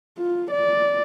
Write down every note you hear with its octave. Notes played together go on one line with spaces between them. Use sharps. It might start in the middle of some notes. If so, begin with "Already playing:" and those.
F4
D5